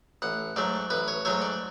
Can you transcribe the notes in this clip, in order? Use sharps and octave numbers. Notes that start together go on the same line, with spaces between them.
A1 F#5
G#2 F#3 A3 D5
A1 B4
C#5
G#2 F#3 A3 C#5
D5